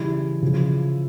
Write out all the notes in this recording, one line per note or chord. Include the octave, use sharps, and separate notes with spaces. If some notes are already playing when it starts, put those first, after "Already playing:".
Already playing: C#3 E3 G3 E4
C#3 F3